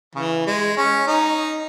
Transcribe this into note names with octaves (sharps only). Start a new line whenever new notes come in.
C#3 E3
G#3
C#4
D#4